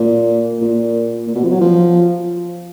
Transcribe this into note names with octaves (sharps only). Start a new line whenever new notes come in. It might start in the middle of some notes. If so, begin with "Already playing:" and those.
Already playing: A#2
A#2
A#2
B2
F3
F#3
F3